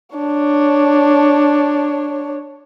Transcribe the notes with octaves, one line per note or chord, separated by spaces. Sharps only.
D4 C#5